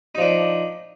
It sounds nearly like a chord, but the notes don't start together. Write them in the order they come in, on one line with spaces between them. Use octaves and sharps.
D#4 F3 D4